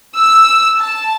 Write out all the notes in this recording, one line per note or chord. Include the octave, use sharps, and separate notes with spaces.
E6
A5